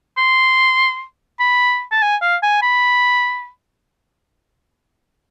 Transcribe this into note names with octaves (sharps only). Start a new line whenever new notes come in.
C6
B5
A5
G#5
F5
G#5
B5